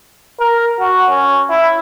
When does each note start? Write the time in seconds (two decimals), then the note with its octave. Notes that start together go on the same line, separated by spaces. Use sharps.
0.39 A#4
0.80 F#4
1.09 C#4
1.50 E4